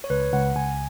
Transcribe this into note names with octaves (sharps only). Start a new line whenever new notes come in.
C#5
C#2 B4
C#2 F#5
C#2 G#5